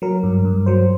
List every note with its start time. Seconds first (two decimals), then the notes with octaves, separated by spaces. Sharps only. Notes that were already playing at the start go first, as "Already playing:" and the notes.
0.02 F#3 A#4
0.23 G2
0.45 G2
0.66 F#3 C5